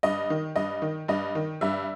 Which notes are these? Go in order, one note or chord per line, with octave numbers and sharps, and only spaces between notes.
G2 D#5
D#3
G2 D#5
D#3
G2 D#5
D#3
G2 E5